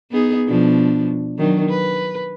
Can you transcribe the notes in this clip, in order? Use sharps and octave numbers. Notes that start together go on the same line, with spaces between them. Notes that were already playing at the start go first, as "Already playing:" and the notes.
B3 D#4 G#4
B2 F3 D4
D#3 F#3 D4
B4